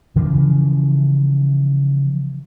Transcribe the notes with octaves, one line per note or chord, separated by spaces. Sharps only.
C#3 E3 F3